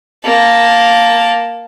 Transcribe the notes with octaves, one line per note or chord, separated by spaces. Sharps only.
A#3 A5